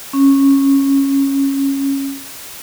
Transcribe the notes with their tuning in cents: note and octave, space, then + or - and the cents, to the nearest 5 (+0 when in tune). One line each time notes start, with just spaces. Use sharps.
C#4 -15